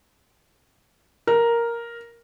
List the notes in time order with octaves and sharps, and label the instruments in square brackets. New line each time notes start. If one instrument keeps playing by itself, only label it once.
[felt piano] A#4